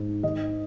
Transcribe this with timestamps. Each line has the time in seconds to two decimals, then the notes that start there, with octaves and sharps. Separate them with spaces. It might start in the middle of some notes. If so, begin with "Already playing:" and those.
Already playing: G#2
0.23 D#3 D#5